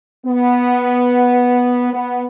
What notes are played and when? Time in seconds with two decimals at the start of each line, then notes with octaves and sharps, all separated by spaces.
0.25 B3
1.93 B3